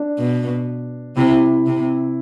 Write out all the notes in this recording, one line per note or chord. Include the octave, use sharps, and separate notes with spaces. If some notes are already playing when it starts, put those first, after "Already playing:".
Already playing: D4
B2
C3 E4
C3